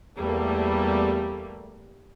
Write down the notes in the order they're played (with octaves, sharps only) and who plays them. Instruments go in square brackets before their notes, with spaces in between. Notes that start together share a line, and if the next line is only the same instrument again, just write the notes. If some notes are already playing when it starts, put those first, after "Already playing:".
[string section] E2 G3 A3 A#3